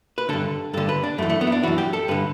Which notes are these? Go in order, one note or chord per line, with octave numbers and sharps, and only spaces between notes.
B4
G2 D3 A4
G2 D3 A4
B4
D4
F#2 E3 A3
A3
B3
E4
D4
F#2 E3 F#4
G4
A4
G2 D3 B4